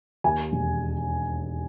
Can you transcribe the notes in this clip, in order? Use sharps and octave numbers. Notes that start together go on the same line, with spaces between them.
D#2 G#5
E1